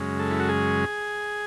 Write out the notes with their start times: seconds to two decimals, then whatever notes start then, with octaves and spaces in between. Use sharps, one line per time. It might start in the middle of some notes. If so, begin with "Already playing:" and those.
Already playing: F#2 C#3 G#3
0.19 A4
0.31 E4
0.40 F#4
0.49 G#4